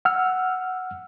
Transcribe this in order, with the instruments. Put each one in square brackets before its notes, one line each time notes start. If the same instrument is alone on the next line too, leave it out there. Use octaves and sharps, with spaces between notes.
[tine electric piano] F#5 E6 F6